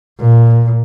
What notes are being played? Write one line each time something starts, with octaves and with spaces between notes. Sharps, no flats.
A#2